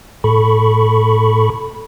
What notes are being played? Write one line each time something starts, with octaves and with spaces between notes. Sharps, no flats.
A2 A4 B5 C#6